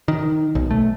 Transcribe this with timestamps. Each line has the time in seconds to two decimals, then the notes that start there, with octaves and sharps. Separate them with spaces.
0.08 D#3
0.55 B1
0.71 A3